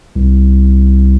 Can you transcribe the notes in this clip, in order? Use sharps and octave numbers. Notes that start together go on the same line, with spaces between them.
C2